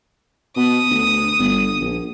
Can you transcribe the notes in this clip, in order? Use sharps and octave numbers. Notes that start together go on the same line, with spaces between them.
B2 D#6
D2
G1
A#1